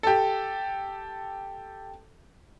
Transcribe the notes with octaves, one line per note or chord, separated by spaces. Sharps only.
G4 A4